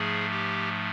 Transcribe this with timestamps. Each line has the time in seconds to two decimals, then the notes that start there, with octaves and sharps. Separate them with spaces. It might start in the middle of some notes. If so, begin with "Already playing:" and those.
Already playing: G#2 F3 A3 G#4
0.30 G4